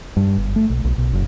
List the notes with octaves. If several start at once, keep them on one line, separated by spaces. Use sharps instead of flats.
G2
G1
A3
B1
B1
B1
F#1